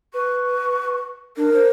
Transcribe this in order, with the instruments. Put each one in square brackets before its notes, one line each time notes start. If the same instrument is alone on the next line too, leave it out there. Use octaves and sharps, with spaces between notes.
[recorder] B4 [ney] C#6
[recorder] D4 [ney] A#4
[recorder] C5